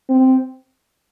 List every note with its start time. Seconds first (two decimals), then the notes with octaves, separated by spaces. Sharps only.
0.09 C4